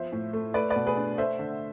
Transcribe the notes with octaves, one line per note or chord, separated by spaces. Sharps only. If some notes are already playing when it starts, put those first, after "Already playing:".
Already playing: F3 B3 C5 E5
A2
A3
A3 B4 D5
B4 D5
B2
G#4 B4
D4
A3 C5 E5
D3